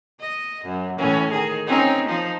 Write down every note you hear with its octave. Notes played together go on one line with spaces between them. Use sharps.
D#5
F#2
A2 E3 C#4
D#3 G#4
C4 C#4 D#4
F3 D#4 C5